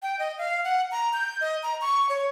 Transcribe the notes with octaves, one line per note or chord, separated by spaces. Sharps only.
G5
D#5
F5
F#5
A#5
G6
D#5
A#5
C#6
C#5